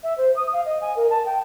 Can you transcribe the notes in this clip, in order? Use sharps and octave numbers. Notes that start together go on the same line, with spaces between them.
E5
C5
D#6
F5
D#5
G#5
A#4
A5
G5